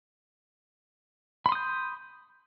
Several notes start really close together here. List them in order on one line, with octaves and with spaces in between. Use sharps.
B5 C6 D#6 G6